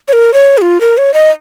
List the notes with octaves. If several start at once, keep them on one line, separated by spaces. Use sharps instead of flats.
C#5
A#4
C#5
G#4
F4
A#4
C#5
D#5